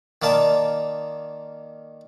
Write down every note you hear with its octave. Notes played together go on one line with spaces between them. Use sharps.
D#3 A#3 D5 A5